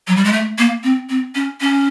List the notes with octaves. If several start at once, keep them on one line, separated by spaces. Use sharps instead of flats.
F#3
G3
G#3
A3
A#3
C4
C4
C#4
C#4